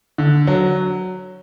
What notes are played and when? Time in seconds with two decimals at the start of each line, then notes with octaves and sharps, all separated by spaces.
0.18 D3
0.47 F#3